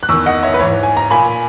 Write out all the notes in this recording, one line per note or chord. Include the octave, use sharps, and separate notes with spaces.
F#6
E2 D#3 C#6 E6
D#5 F#5
C#5 E5
B4
G#2 E3 C#5
G#5
A#5
A#2 G#5 B5